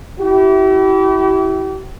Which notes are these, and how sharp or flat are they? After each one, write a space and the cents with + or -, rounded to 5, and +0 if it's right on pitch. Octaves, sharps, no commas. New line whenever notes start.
E4 +0 G4 -40